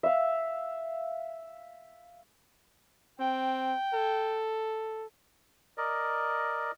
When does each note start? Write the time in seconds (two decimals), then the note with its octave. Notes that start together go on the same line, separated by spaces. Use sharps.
0.03 E5 F5
3.20 C4 G5
3.94 A4
5.78 A#4 D5 D#5